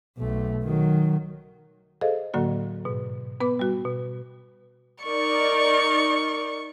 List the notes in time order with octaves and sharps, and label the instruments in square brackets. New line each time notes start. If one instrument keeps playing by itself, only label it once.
[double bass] B1 A3
D#3 F#3
[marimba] G#4 A4 C5 D#5 F5
A2 D3 F#3 A#3 F#4
G#2 B2
B3 B4 B5 D6
G3 F#4
B2
[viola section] D#4 A#4 D5 [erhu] C#6